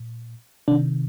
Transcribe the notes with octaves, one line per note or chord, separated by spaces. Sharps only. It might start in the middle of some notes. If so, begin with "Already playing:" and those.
Already playing: A#2
C3 D#3 D4